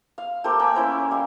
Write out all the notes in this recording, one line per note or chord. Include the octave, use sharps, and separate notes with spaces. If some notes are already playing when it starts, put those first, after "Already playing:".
F5
A3 A#3 G4 C5
A#3 G#5 B5 E6
C#4 E4 C5
G3 F5